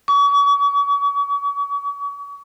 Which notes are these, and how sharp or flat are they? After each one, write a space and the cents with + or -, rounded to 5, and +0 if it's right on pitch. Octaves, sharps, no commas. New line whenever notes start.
C#6 +40